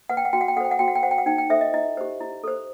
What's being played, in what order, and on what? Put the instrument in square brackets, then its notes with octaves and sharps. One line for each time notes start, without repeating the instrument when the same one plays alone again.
[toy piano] B4 F#5
G5
F#5
F#4 G5
F#5
G5
A4 F#5
C5 G5
F#5
F#4 G5
F#5
G5
C5 F#5
G5
F#5
D#4 G5
G5
A4 C5 E5
D#5
E4 D#5
G4 C5
E4
A4 C5